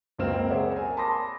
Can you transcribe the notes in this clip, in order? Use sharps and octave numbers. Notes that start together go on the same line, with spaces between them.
C#2 F#2 A#3 C4 F6 E7
G#4 A#4 C#5 D5 E5 F#5
A#4 G#5
A5 B5 C6 D6 D#6 A#6